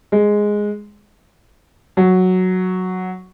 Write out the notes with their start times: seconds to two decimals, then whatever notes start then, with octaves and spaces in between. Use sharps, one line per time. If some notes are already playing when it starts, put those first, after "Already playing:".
0.12 G#3
1.97 F#3